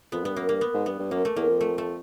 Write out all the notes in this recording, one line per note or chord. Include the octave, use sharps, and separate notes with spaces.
F2 B3
G2 B3
F#2 A#3
G2 A#3
B3
G#2
G2 B3
G2
F#2 A#3
A3
E2 A#3
F2
A3
A3